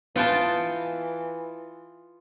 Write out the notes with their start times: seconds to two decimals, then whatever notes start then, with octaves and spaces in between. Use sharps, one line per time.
0.16 E3 B3 F4 G5 A5